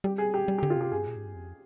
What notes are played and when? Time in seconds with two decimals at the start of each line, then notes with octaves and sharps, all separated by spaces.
0.04 G3 G4
0.18 G#4
0.34 G4
0.48 G3
0.58 G4
0.63 D3
0.70 F4
0.77 C3 G4
0.92 G2 G#4
1.07 A#2
1.16 G#2
1.26 G2
1.35 F2